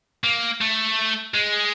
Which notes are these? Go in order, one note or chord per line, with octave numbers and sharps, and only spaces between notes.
A#3
A3
G#3